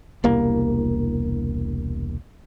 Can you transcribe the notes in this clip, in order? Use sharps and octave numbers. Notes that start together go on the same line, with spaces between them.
E1 C2 A#3